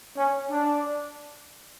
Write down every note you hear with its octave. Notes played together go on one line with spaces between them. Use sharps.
C#4
D4